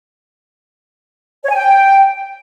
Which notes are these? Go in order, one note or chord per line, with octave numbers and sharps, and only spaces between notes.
C#5
G#5
G5